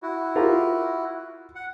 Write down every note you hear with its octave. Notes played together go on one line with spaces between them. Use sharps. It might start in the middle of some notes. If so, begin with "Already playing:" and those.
E4 F#4
F4 G4 A#4
F#5